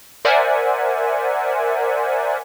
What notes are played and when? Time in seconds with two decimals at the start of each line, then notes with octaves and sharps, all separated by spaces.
0.25 A#4 C5 D5 E5 F#5 G#5